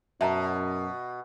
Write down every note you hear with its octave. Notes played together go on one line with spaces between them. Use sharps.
F#2 B2 E5 A5 A#5